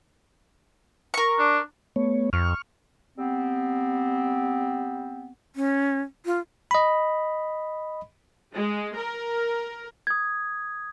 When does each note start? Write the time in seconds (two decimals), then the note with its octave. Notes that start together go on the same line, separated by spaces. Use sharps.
1.14 A#4 C#6
1.39 D4
1.96 A3 B3 C#5
2.33 F2 C#6 F6
3.18 G3 B3 C4
5.56 C#4
6.26 F4
6.71 D#5 B5
8.53 G#3
8.97 A#4
10.07 D#6 G#6